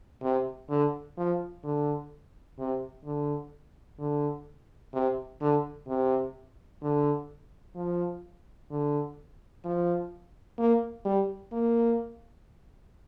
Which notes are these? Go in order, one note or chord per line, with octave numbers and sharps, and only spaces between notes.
C3
D3
F3
D3
C3
D3
D3
C3
D3
C3
D3
F3
D3
F3
A#3
G3
A#3